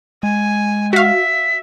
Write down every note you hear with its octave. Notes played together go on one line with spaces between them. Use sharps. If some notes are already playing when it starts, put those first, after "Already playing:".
G#3 G#5
F#4 E5 F5 B6